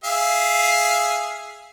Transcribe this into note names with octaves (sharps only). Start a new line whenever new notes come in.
G#4 E5 F5